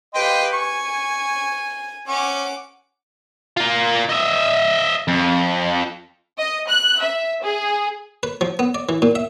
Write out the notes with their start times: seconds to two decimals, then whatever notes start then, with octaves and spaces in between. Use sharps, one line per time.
0.14 G4 B4 D#5 F5 G5 C6
0.53 G#5 C#6
2.07 C#4 F#5 D6
3.57 A#3 F4
4.09 D#5 E5
5.08 F2
6.39 D#5
6.67 F#6
7.00 E5
7.44 G#4
8.23 B4
8.41 F3
8.59 B3
8.75 D5
8.89 E3
9.02 A#2
9.15 E5